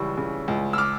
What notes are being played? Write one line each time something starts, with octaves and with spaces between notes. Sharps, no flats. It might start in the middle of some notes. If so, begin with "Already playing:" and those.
Already playing: C#2 C#3 E3 G3 C#6 E6
C#3
C#2
E6
D6 F6